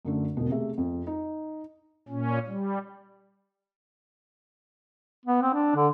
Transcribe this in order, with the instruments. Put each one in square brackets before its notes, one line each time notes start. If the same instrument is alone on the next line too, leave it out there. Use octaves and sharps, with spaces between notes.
[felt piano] F#2 D3 A3
E1 B2
C3 A3 G#4 E5
F2
D#4
[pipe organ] A#2 C#4
G3
[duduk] B3
C4
D4
D3